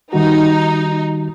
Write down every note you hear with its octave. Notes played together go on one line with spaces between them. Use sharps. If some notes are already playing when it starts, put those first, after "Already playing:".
D#3 G3 D#4 F#4